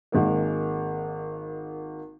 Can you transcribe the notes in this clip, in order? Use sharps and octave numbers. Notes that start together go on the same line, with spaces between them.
G#1 G#3 A#3